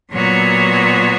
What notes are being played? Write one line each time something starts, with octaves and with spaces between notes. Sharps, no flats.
A#2 F#3 B3 F#4 C#5